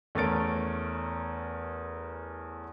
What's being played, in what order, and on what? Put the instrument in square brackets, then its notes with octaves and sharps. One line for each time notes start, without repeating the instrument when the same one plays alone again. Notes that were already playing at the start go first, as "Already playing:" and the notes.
[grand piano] E2 A3 C#4 A#4 A6 D7